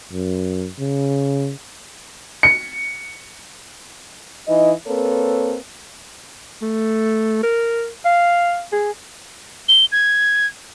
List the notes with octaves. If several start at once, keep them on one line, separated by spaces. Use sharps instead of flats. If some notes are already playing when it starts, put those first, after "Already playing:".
F#2
C#3
C#7
E3 D#4 D#5
A#3 C4 A4 B4 C#5
A3
A#4
F5
G#4
G7
G#6